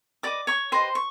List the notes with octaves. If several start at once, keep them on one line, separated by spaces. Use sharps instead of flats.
G4 B4 D5 D#5 D6
C#5 C#6
G4 B4 C5 D#5 C6
C#6